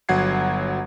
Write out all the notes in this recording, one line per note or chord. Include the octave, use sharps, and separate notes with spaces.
G1 F#3 F#5 G#6 C7